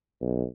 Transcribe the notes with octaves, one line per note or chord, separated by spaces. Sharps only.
B1